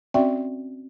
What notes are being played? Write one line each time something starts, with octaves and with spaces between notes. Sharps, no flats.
C4 C#4 F#4 D5 E5 G5